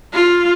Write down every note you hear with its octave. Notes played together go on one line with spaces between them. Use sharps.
F4